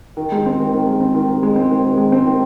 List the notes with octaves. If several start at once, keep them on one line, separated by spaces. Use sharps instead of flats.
D#3
G#3
C4
D#3
D#3
G#3
C4
D#3
D#3
G#3
C4
D#3
D#3
G#3
C4
D#3